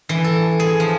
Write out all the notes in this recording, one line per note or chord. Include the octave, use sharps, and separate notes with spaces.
E3
A4
G#4
F3